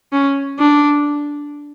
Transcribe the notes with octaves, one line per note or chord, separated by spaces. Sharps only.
C#4
D4